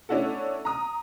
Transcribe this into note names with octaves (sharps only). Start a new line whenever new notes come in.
A3 C#4 D4 E4 F#4 A4
A#5 D#6